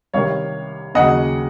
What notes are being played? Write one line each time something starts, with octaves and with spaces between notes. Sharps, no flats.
C2 C3 D#3 C#5 F5
D#2 C#3 F#3 D#5 F#5